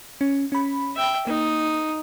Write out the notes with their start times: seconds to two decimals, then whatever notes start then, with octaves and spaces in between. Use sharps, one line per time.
0.21 C#4
0.52 C#4 B5
0.96 E5 G5
1.27 A#3 D#4